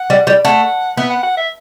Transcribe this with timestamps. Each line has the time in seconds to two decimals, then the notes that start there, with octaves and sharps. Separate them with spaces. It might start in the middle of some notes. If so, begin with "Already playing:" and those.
Already playing: F#5
0.10 G3
0.27 G3
0.45 A3 F#5
0.97 B3 E5
1.10 F#5
1.23 F#5
1.37 E5